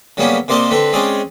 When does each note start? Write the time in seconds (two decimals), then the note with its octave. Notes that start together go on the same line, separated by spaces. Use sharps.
0.17 C#3 F#3 G3 A#3 B3 C#4
0.48 C3 A#3 C5 D5 D#5 A5
0.71 D3 C4 B4
0.93 G#3 C4 C#4 G#4 D5